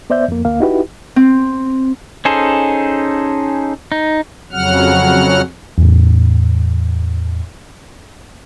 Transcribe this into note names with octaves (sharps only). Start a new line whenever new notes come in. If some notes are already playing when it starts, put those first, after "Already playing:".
B3 C5 D5 E5 G6
F2 A#3
D2 A#3 F5
D#4 E4 F#4 G4 B4
C4
C#4 D#4 G#4 A4 C5
D#4
F2 C#3 F#3 F#5 F6
E2 A2